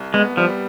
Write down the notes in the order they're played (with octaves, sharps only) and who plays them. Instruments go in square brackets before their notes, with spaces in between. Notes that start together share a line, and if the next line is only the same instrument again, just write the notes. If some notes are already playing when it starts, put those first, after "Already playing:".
Already playing: [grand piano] C2
[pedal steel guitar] G#3 [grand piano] B3
[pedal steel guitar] F3 [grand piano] G3